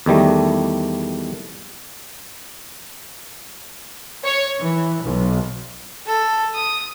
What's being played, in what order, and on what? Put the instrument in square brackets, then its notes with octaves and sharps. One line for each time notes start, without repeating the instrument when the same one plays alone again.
[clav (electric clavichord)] E2 D#3 G3 A3
[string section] C#5
E3
B1
[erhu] A4
D#6